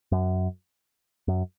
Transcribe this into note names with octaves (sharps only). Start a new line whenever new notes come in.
F#2
F#2